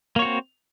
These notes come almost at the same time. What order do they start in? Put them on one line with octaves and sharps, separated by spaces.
A#3 C#5 F#4 C4